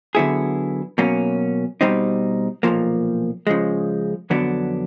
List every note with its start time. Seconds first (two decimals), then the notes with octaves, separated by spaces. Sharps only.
0.15 D3 F#3 B3 E4 G#4
0.98 B2 F#3 A#3 C#4
1.81 B2 G3 C4 D#4
2.63 B1 A#2 F3 A#3
3.47 C#3 F3 G#3
4.30 F2 D3 F#3 B3 D4